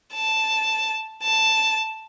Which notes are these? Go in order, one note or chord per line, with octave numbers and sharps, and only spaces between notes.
A5
A5